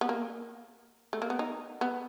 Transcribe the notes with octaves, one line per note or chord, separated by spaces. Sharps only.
B3
A#3
A3
A#3
B3
D#4
B3